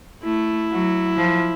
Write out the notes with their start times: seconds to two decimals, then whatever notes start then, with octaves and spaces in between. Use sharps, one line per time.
0.23 A3 E4
0.70 F#3
1.16 F3